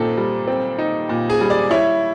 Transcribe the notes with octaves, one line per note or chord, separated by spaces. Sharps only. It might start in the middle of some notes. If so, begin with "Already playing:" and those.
Already playing: A#2 C4 D#4 A4 A5
G3
C4
D#4
A#2
G#4 G#5
G3
D5
E4 C#5